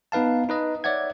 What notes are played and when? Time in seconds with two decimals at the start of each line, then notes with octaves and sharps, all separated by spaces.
0.12 B3 D#4 B4 F5 A5
0.49 D#4 B4 D#5
0.84 C#5 D5 E5 F#5 G#6